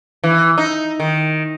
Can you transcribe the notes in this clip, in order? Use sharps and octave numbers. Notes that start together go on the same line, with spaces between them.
E3
D#4
D#3